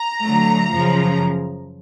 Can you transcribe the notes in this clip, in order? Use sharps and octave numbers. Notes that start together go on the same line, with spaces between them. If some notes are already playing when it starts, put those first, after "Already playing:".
Already playing: A#5
D3 F#3 A3
F#2 C#3 F3